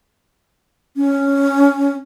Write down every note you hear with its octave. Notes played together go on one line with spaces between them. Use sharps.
C#4